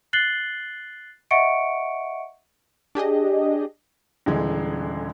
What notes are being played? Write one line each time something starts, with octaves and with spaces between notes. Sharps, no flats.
F#6 A6 C7 F#7 G7
D#5 E5 F#5 C#6 C#7 D7
D4 G4 G#4 D#5
D#1 D3 E3 G#3